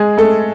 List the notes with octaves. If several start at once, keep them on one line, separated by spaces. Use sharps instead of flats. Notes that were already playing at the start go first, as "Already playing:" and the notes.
Already playing: G#3 G#4
A3 A4